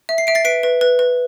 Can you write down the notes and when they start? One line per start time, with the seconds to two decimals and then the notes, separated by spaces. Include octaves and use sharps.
0.09 E5
0.18 C7
0.27 E5 D7
0.35 A6 C7
0.45 B4 B6 D7
0.63 B4
0.81 B4
0.99 B4